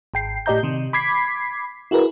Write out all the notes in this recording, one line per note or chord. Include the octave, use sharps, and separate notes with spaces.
G#1 G5 C7
A2 G4 D5 D#5 A#5 G6
C3 D#3
B5 D6 G#6 B6 C7
E4 F#4 G#4 A#4 B4